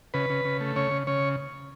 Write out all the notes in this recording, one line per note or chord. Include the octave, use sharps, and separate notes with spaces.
C#3 B4
C#3
C#3
A3
C#3 C#5
C#3
C#3 C#5